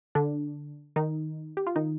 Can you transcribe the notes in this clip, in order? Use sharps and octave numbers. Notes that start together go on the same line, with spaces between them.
D3 D4
D#3 D#4
G4
F4
D#3 D#4